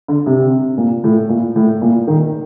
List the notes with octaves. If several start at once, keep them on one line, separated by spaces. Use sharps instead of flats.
D3
C3
A#2
A2
A#2
A2
A#2
D#3